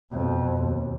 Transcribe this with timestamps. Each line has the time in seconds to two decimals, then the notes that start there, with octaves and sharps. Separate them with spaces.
0.12 F2 B2
0.63 D#2